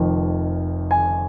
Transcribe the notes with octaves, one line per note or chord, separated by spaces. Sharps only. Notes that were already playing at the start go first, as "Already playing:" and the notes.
Already playing: F1 F2 D#3
G#5